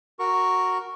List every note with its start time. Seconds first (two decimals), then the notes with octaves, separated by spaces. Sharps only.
0.19 F#4 A#4 C#6